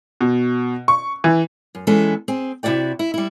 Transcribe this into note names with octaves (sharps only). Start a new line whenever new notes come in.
B2
C#6
E3
F#2
E3 G#3 B3 C#4 A4
C4 G#4
C3 E4 F#4 D5 G5
E4
G3 E4